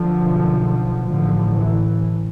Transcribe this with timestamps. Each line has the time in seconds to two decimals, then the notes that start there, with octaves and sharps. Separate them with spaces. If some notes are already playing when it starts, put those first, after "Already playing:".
Already playing: D3 F3
0.10 B1 B2
1.07 A1 A2 D3 F3
1.57 E3